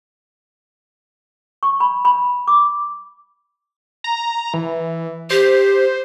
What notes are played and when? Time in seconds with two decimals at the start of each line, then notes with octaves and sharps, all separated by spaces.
1.63 C#6
1.80 B5
2.05 B5
2.48 D6
4.04 A#5
4.54 E3
5.30 G4 C5